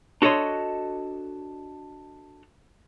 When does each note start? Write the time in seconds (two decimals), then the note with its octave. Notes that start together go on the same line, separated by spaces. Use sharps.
0.22 D4 F#4 A4 C#5 D#5 C6